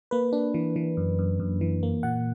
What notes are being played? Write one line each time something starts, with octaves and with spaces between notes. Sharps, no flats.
A#3 B4
D4
E3
E3
F#2
F#2
F#2
E3
A#3
A#2 F#5